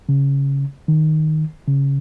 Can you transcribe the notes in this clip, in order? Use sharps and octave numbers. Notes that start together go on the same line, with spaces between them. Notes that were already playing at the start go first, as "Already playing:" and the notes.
C#3
D#3
C#3